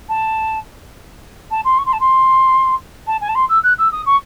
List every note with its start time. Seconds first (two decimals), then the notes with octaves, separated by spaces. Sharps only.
0.08 A5
1.50 A5
1.64 C6
1.78 C#6
1.85 C6
1.92 A5
2.00 C6
3.07 A5
3.21 G#5
3.28 A5
3.35 C6
3.49 E6
3.63 F#6
3.78 E6
3.92 D#6
4.06 C#6